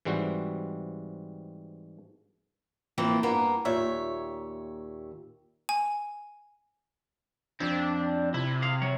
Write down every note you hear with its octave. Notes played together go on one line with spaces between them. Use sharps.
G#2 E3 G3 C4 F#4
E3 F3 A#3 C4
G2 A#3 B3
D#2 A#2 C#5 E5
G#5
F2 C4 D4
C3 E4
G#4 F5
F#3 C#5